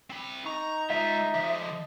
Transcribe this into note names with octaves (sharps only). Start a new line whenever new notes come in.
C4 B5
D#4 A#5 C#6
G#3 F4 D#5 E5
D3 F3